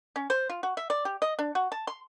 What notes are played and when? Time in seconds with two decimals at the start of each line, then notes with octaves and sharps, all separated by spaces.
0.16 C#4
0.30 C5
0.50 F4
0.63 F#4
0.77 E5
0.90 D5
1.05 G4
1.22 D#5
1.39 D4
1.55 F#4
1.72 A5
1.87 C6